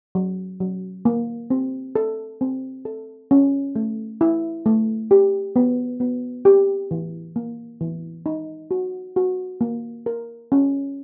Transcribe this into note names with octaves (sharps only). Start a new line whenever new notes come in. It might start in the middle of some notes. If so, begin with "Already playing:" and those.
F#3
F#3
A#3
C4
A4
C4
A4
C#4
A3
E4
A3
G4
B3
B3
G4
E3
A#3
E3
D#4
F#4
F#4
A#3
A#4
C#4